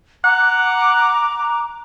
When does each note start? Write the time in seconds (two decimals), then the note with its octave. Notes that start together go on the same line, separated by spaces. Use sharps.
0.24 F#5 A#5 D6 F#6